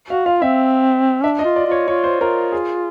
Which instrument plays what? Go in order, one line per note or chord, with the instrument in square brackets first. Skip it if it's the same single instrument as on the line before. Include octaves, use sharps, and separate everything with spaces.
[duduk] F#4 [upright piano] F5
[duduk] F4 [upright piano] F5
[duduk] C4 [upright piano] E5
[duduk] D4 [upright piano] E5
[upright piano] D#5
[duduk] F4
[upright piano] D5
[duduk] F4 [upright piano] C#5
[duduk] F4 [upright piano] C#5
[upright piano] C5
[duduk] F4 [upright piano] A#4
[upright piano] G#4